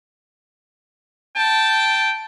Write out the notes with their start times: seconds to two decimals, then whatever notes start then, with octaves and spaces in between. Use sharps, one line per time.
1.36 G5 A5